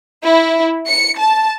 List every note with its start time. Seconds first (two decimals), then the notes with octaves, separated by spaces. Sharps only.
0.23 E4
0.87 C#7
1.19 A5